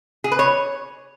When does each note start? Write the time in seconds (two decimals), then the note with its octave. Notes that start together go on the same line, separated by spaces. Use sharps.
0.24 G#4
0.32 B4
0.39 C#5